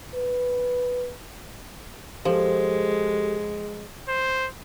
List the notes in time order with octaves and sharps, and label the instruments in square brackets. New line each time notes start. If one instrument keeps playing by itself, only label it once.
[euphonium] B4
[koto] F3 [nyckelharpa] G#3 [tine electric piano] G4 A4
[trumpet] C5